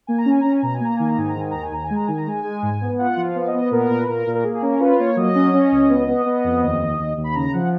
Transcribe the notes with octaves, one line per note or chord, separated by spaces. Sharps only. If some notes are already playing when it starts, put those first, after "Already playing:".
A#3 G#5
A#5
C#4 G#5
C#4 A#5
G#5
B2 A#5
G#5
A#3 A#5
D#3 G#5
A#5
G#2 G#5
A#5
D#3 G#5
D#2 A#5
G#5
D#2 A#5
G#5
G#3
A#5
D#3 G#5
A#5
G#3 G#5
G#3
G#2
B3
F4 F#5
F3
F5
B3
F5
D#5
B3
A#2 A#4
A#2
B4
A#2 A#4
A#2
A#4
A#3 G#4
G#4
C#4 A#4
F4 B4
A#3 C#5
F#3 D#5
C#4
C#4
C#2
B3
B3
B3
F2
D#2
D#2
D#2
D#2
B5
C#3 A#5
F3 F#5